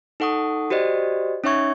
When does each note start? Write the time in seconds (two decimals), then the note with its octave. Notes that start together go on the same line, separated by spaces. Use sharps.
0.20 D#4 A4 F#5 C#6 D#6
0.70 F#4 G4 C5 D5 D#5
1.44 C#4 D#4 C#5 E5 C#6 G#6